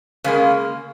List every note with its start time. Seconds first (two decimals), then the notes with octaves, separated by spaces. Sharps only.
0.24 C#3 G#3 A#3